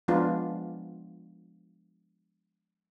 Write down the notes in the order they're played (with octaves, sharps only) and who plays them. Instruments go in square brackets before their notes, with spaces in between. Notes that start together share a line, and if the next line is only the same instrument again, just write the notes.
[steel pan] F3 G#3 B3 D4 F4